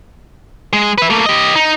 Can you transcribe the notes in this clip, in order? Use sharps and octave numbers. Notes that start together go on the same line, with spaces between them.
G#3
B4 E5
A3 A#3
G4 D#5
D#4